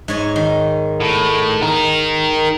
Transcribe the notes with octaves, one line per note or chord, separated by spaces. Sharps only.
G#2 C#5 G#5
D#3
A2
D#4 A#4